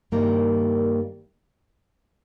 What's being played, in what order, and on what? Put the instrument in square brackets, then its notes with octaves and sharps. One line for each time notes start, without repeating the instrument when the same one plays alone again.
[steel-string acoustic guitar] G2 D#3 G3 A#3